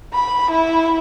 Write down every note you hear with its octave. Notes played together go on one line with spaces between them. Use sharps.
B5
E4